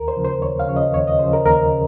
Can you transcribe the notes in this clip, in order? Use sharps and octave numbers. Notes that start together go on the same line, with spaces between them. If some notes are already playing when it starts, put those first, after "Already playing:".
Already playing: D#2 A#4
C5
C#3 F3
C5
D#2 C#5
F5
C#3 F3 C#5
D#5
D#2 C#5
D#5
C#3 F3 C5
A#4
D#2 A#4
C#3